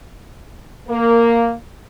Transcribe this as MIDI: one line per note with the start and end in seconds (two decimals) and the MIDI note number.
0.89 1.53 58